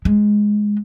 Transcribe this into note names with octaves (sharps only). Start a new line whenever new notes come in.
G#3